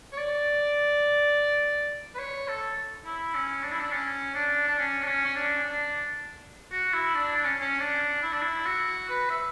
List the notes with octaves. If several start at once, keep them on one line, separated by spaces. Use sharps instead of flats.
C#5
D5
B4
C#5
A4
E4
C#4
D4
E4
D4
C#4
D4
D4
C#4
D4
C#4
C#4
D4
D4
F#4
E4
D4
D4
C#4
C#4
D4
E4
D4
E4
F#4
B4
E5